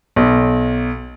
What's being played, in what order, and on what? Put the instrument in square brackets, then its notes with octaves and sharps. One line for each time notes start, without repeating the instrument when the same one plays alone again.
[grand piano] B1